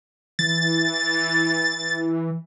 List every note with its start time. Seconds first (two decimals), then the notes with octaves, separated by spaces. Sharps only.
0.39 E3 A6